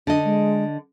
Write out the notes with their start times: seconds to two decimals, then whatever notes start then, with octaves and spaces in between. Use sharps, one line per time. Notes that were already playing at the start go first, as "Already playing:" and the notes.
0.07 D3 D4 D#5
0.24 G#3